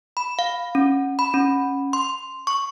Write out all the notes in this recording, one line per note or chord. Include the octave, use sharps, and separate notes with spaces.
B5
F5
C#4
B5
C#4
C6
C#6